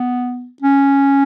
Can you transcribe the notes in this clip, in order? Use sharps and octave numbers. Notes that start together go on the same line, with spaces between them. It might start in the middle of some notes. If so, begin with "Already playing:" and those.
Already playing: B3
C#4